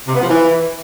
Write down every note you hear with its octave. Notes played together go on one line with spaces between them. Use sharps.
C3
B3
F3
E3